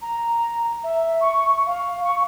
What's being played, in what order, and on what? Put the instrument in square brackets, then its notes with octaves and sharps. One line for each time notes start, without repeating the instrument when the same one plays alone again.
[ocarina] A#5
E5
C#6
F5
C#6